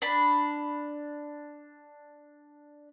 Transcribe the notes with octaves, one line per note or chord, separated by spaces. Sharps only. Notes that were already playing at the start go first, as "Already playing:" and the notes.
D4 B5